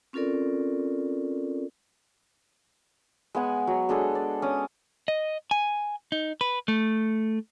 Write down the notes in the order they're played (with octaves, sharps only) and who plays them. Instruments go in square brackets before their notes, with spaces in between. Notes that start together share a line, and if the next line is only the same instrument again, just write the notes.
[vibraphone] C4 C#4 F4 A4 A#4 D5
[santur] G#3 B3 F#5 G#5
F#3
G#3 D4 G#4 A4
D5
C#4 D6 D#6
[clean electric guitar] D#5
G#5
D#4
B4
A3